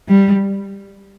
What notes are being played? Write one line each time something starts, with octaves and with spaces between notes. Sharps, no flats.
G3